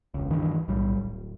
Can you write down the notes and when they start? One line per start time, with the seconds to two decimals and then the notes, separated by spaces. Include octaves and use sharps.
0.14 E1 C#2
0.30 D2 G2 D#3 E3
0.68 B1 A2 G3
0.97 D1